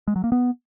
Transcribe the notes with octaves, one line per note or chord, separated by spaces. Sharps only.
G#3
F#3
A#3
B3